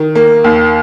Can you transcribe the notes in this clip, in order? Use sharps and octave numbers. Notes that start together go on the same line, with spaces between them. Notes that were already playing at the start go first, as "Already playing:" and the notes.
Already playing: D#3
A#3
D#2